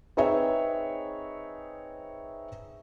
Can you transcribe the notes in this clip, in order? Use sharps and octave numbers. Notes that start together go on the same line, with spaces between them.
C4 D#4 G#4 B4 C#5 E5